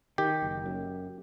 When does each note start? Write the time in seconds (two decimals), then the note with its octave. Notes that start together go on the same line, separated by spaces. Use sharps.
0.18 D#3 G4
0.42 F#1
0.66 F#2